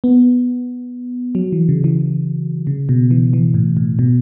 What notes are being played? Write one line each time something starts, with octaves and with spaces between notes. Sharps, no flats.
B3
F#3
E3
C#3
E3
C#3
B2
E3
E3
A2
A2
B2